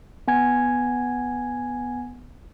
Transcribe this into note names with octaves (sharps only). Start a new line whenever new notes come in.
B3 G#5 G#6